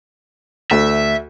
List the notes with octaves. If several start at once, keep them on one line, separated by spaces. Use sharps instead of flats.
D2 E5